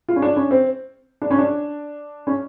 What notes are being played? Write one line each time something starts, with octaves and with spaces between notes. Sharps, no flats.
F4
C#4
D4
C#4
C4
D4
C#4
D4
C#4